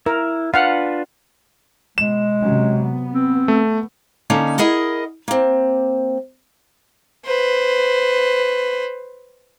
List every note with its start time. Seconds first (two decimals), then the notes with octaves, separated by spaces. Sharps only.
0.06 E4 A#4
0.54 D4 F4 B4 F5 F#5
1.98 B2 G#3 E7
2.41 C3 F#3 C#4
2.80 B3
3.12 C4
3.48 A3
4.30 D3 A#3 C#4 D#4
4.58 E4 G#4 A#4 D#5 F#5
5.28 A#3 C4
7.26 B4 C5